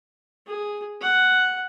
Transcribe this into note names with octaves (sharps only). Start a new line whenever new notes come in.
G#4
F#5